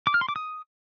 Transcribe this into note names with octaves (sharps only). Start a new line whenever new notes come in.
D6
F6
C6
D6
D#6